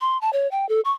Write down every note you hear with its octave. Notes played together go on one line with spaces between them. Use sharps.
C6
A5
C#5
G5
A4
C#6